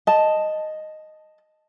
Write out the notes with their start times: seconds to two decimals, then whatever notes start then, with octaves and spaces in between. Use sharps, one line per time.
0.07 D#5 A5